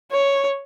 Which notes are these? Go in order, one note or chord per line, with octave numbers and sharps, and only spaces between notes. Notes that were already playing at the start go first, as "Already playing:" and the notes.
C#5